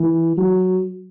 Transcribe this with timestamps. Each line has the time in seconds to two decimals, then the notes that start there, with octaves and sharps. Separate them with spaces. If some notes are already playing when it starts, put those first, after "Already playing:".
Already playing: E3
0.37 F#3